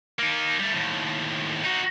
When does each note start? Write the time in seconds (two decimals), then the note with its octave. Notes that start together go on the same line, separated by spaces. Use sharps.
0.19 A#3 D#4
0.59 G3 A3
0.73 D#2 A2
1.64 D#4 F#4